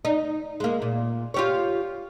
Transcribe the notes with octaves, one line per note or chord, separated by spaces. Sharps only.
D#4
G#3 A#3
A#2
F4 G4 C#5